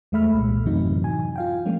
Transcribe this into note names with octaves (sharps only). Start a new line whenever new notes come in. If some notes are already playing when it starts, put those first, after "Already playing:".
E2 G#3 A3 E5 B5 F6
C2 A#2
F#2 A2 C3 E3 F#3 D#4
G#5
F4 F5 G5
F3 G#3 A#3 C#4